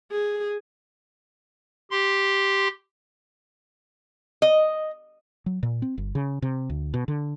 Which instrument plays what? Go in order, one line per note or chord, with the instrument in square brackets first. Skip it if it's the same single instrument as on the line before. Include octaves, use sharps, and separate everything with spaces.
[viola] G#4
[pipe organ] G4 C6
[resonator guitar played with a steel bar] D#5
[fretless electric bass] F#3
A#2
C4
G1
C#3
C3
D2
B2
D3